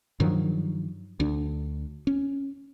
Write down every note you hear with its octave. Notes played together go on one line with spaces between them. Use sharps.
G2 D#3 F3 F#3
D2 D4
C#4